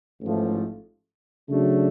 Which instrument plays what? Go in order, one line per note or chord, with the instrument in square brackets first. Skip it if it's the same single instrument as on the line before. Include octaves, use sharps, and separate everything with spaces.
[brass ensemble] A1 G#2 F3 A3
C#3 F#3 A3 D4